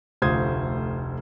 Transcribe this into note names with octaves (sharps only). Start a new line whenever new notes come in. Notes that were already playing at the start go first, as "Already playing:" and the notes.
F1 D2 F4 C5 D#6 G#6